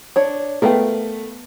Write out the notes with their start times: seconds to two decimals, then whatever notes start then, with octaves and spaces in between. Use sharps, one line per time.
0.16 D4 C#5
0.62 A3 B3 A#4 F5 G5